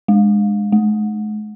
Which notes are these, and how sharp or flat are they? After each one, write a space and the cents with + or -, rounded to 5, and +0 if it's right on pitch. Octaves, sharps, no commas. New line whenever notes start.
G#3 -10
G#3 +40